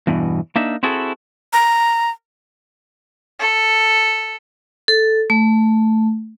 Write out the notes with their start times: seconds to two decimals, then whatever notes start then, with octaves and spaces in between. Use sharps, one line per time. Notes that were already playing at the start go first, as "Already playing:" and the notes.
0.07 E2 G2 B2 E3
0.56 A#3 D4 D#4 E5
0.83 C4 E4 F#4 G#4 A4
1.53 A#5
3.39 A4
4.88 A4
5.30 A3